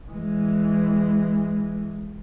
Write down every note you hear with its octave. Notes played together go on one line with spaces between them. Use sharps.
E3 G#3